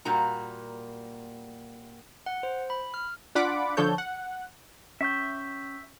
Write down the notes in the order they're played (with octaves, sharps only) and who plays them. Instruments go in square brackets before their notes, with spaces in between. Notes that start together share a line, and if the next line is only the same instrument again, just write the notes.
[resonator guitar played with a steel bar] A#2 G3 A#3 F#4 A#5
[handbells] F#5
C5
B5
F6
[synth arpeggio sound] D4 F4 D5 F#5 B5 D6
D3 F3 D4 A4 C#5 G6
F#5
[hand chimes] C#4 C#6 G6 [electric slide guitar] E5